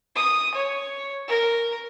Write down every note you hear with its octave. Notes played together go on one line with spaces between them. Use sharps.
D#6
C#5
A#4